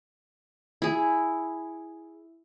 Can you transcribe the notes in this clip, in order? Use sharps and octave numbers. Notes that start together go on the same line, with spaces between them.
E4 G#4